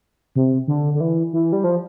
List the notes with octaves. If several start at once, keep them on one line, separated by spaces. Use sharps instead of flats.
C3
D3
D3
E3
E3
G3
F3